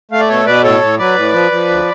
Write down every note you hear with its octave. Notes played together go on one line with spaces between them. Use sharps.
A3 F5
D5
B2 A4 C#5
B2 B4 D5
A2 A4 C#5
A2
F#3 B4 D5
A2
F3
F3
D2